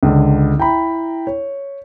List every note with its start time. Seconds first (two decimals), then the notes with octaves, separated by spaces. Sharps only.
0.03 C#2 D3
0.58 E4 G5 A#5 B5
1.27 C#5